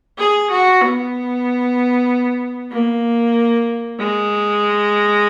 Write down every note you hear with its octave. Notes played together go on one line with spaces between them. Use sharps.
G#4
F#4
B3
A#3
G#3